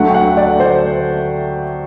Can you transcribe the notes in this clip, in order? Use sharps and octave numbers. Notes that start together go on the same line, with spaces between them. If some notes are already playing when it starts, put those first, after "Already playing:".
Already playing: D2 D3 F#3 A3 F#5
G5
F#5
D5
C5